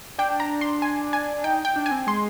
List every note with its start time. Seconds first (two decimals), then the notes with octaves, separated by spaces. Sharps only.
0.18 D4 G5
0.40 A#5
0.61 C6
0.82 G#5
1.13 G#5
1.44 D#4 G5
1.65 G5
1.76 D4
1.86 G#5
1.91 C4
2.07 G#3 C6